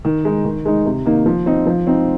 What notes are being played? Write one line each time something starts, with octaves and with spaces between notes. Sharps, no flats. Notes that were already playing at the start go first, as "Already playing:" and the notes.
D#3
G#3 D#4
D#3
G#3 D#4
C3
D#3 A#3 D#4
F3
C4 D#4
F3
C4 D#4